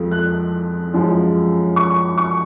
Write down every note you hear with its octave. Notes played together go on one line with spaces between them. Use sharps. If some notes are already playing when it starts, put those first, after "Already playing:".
Already playing: F2 F3 G#3
F#6
F#2 F3 G#3
C#6
C#6